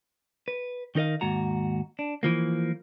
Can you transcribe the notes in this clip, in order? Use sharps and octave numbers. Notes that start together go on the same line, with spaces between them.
B4
D#3 D#4 A#4 D#5 F5
D#2 G#2 F#4 A#5
D4
E3 F3 A#3